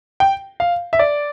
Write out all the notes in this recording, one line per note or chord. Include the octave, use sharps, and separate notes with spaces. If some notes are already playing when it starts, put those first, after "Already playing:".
G5
F5
E5
D5